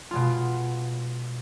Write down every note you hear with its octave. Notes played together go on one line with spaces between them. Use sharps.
B2 G#3 F4